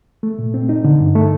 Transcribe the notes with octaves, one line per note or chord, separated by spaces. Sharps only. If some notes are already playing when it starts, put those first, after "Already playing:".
A3
A#2
C4
D#4
D3
G2
A3